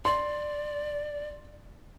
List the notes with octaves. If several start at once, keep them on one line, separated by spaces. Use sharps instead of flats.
D5 C6